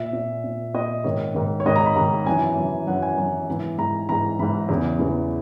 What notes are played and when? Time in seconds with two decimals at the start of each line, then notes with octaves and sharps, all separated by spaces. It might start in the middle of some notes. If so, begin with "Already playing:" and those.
Already playing: A#2 E5
0.13 A#2
0.44 A#2
0.74 A#2 D#5
1.04 G#2 D#3 C#5
1.35 G#2 D#3
1.60 C#5
1.66 G#2 D#3 D#5
1.76 A#5
1.86 B5
1.96 G#2 D#3 A#5
2.26 F#2 E3 G#5
2.56 F#2 E3
2.87 F#2 E3 F#5
3.02 G#5
3.17 F#2 E3 G#5
3.48 G#2 E3
3.78 G#2 E3 A#5
4.09 G#2 E3 A#5
4.39 G#2 E3 B5
4.69 E2 C#3 E3
4.99 E2 C#3 E3